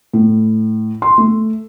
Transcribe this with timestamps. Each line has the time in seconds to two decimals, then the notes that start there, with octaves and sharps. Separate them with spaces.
0.13 A2
1.02 C6
1.18 A3